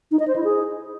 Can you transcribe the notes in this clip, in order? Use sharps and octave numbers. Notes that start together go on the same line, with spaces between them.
D#4
D#5
C5
E4
G#4